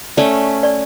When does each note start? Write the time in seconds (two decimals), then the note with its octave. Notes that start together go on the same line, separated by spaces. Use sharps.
0.17 A3 C#4 D5
0.63 D5